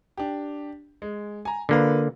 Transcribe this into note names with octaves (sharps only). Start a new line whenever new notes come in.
D4 G4
G#3
G#5 A#5
D3 A#3 F4 A#4 B4